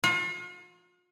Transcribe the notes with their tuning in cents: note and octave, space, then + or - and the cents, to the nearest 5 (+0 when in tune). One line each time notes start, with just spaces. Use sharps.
F4 +45